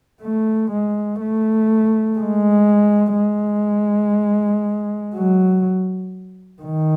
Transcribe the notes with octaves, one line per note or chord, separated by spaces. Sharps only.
A3
G#3
A3
G#3
G#3
F#3
D#3